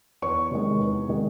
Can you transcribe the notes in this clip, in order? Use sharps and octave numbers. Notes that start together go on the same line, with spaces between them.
E2 C#5 C#6
C3 D#3 G#3
E2
C3 D#3 G#3